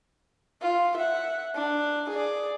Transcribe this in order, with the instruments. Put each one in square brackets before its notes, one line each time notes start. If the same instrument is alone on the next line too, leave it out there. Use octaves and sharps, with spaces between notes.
[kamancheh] F4
E5 F#5
D4
G#4 D5